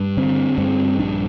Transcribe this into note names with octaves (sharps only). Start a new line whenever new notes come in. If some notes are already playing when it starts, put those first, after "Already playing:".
Already playing: G2
D3 C4
G2 C4
A#1 D4